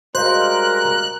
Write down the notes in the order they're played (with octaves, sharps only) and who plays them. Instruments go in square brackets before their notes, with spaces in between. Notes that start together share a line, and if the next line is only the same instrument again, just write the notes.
[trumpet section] G3 G#3 A#4 [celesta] F#4 D#5 F5 [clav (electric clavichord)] C5 [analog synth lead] F#6